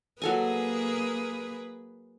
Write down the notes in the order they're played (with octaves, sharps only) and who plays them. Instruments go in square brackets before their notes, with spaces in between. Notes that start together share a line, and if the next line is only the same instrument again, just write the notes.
[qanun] F#3 A4 G#5 [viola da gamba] A#3 G#4 B4